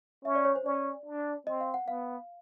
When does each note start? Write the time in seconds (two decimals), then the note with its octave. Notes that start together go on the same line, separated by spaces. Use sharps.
0.25 C#4 E5
0.35 D5
0.45 C#5
0.56 C5
0.65 C#4 D5
1.06 D4
1.47 C4 D#5
1.61 F5
1.74 F#5
1.88 B3 F5